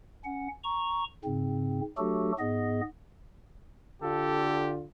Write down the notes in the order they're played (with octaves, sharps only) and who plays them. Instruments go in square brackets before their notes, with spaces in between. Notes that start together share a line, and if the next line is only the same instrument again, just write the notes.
[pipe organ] C#4 F#5
A#5 C#6
G#2 C#3 C4
F#3 A3 D4 F#4 G4 A4
G#2 B3 G#4 D#5
[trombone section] D3 F4 [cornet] G4 [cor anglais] A4